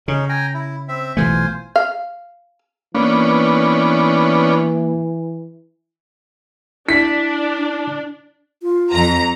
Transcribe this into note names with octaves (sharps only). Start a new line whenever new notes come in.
C#3 C#4 D#4
G5 G#5 A#5
E4
C4 E5
B1 E3 A3 F4 C5 G#5
F5
E3 A#3 B3 C#4 D4
D4 E4 B6
F4
F2 A#5